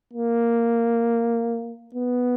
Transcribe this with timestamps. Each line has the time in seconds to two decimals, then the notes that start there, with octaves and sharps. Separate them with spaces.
0.13 A#3
1.95 B3